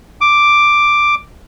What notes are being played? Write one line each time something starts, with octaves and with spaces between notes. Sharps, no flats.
D6